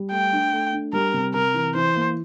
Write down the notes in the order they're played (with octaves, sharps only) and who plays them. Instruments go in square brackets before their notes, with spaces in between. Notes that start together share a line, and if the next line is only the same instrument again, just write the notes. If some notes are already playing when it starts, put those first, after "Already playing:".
Already playing: [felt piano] G3
[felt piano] A3 [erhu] G5
[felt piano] D4
A3
D4
[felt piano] G3 [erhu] A#4
[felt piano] C3
[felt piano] C3 [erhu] A#4
[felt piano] E3
[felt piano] E3 [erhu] C5
[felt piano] A#3